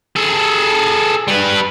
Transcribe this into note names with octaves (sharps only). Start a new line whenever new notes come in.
G#4 A4
G3 B4